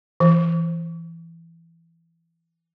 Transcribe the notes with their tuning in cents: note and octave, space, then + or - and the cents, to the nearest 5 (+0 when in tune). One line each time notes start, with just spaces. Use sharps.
E3 +15